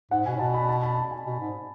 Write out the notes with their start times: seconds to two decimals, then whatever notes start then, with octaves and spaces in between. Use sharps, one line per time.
0.11 G#2 F#5
0.26 B2 G#5
0.36 A2
0.39 B2 A5
0.54 B5
0.69 A5
0.83 B5
0.97 A5
1.11 G#5
1.26 B2
1.40 G#2